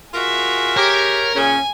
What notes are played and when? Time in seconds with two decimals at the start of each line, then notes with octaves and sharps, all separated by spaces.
0.14 F4 F#4 G#4 A#4 E5
0.77 G4 A#4 C#5
1.35 A#2 C#3 C#4 G#5